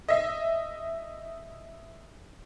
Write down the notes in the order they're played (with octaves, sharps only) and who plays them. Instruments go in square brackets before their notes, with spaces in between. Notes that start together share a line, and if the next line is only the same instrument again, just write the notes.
[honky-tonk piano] D#5 E5